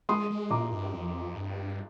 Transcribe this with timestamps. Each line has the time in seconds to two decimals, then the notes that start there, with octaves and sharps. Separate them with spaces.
0.09 G#3 C6 D#6
0.30 G#3
0.51 A#2 A#5 D6
0.72 G2
0.93 F2
1.35 G2